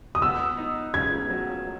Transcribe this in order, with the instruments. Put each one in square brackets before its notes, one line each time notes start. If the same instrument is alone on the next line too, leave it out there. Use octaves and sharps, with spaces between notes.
[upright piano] D#6
[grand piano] B3 [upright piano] E6
[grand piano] D#4
[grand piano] C#3 [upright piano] G#6
[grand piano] F#3